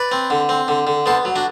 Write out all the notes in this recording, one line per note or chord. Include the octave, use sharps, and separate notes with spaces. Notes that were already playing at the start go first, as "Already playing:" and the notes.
Already playing: B4 D5
C4
D3
C4
D3
D3
B3 A4 C5
F#3
D4 F#4